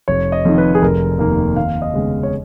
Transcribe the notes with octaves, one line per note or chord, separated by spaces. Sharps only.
F1 C#5
D#5
F2 D#3
B4
G#4
F1 A#4
D#2 D#3 A#3
D#2 F5
D#5
C#3 G#3 B3
C#5